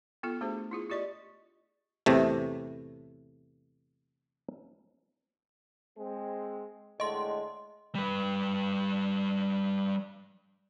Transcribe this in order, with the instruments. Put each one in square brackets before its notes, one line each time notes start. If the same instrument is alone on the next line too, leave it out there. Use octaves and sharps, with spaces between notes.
[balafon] B3 F4 A4
A3 D4 F#4 G#4 C5
E4 F4 G#4
F4 G4 D5 D#5 C#6
[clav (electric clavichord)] E2 A2 C3 A3
[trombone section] G#3 C4
[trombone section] A2 D3 G#3 [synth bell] D#5 C6
[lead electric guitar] G3 B4